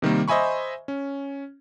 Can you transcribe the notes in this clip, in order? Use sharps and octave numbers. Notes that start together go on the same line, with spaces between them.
C3 D#3 G3 A#3
C5 D#5 E5 G#5 B5 C#6
C#4